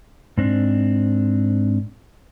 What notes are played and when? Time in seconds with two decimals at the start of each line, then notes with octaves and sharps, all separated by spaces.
0.38 G#2 C4 D4